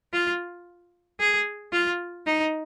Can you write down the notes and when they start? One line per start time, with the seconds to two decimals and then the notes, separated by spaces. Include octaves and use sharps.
0.13 F4
1.20 G#4
1.73 F4
2.26 D#4